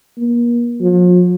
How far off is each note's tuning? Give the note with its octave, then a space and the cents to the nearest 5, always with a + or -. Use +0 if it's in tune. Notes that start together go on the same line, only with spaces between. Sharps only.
A#3 +35
F3 +45